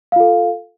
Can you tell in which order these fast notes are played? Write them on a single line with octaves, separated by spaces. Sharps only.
F5 F4 A4